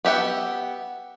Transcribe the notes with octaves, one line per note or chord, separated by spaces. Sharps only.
B3 G4 E5 F#5